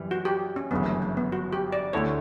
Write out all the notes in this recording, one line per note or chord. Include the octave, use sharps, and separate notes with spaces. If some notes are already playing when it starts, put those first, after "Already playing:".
Already playing: F#2 E3 G3
F#4
G4
C#4
G1 F#2 C#3 E3 B3
A3
A3
B3
F#4
G4
D5
D2 D3 A3 E4 C#5